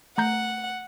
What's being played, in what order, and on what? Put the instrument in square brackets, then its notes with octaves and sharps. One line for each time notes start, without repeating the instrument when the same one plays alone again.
[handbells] A3 A#5 G6 [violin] F#5